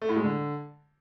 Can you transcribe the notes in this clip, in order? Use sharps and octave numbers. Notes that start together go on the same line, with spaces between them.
A3
A2
G#3
D3